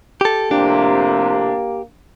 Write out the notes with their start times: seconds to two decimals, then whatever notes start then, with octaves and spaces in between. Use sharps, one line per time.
0.21 G4 A4
0.51 F2 A2 C3 A#3 D4 G4